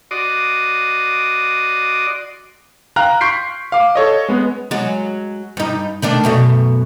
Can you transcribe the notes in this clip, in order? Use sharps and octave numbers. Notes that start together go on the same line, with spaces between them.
F#4 D5 D#5 C6 D6 D#6
F5 G5 A#5 F6 F#6
C6 C#6 G6 B6 C7 D7
F5 D6
A4 C#5 D#5
G#3 B3
F#3 G#3
G2 D#4
D#3 A3 D4
F#2 B2 A3